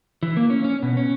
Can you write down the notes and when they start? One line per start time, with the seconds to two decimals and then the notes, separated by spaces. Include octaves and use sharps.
0.23 E3
0.37 A#3
0.50 C#4
0.64 C#4
0.83 B2
0.97 C#4